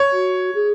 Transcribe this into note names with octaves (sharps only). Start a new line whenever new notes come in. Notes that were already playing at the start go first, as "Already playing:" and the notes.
Already playing: C#5
F#4
G#4